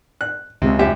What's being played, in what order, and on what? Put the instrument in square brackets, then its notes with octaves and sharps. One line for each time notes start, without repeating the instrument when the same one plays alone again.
[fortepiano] F#6
[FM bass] C#2 [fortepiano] C3
[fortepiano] F#2 G4 E5